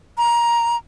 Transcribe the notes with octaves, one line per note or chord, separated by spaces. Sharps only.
A#5